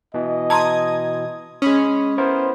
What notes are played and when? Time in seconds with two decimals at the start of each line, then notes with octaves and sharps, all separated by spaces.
0.14 B2 E3 D#5
0.50 A5 A#5 C6 D#6 G#6
1.62 G#3 C#4 B5 D#6
2.18 B3 E4 A#4 C5